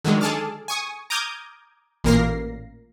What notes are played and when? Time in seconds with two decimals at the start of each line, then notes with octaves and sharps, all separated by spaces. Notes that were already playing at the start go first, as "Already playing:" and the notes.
0.04 D3 D#3 F#3 G#3
0.21 G#4 A4 A5 D6 F6
0.68 G#5 C#6 D#6
1.10 A#5 D6 D#6 F6 G6 G#6
2.04 A1 A#2 A#3 A#4 A#6 C7